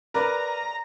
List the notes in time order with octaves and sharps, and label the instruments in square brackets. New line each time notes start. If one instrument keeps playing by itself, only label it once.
[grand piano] A#4 B4 D5 [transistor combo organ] A#5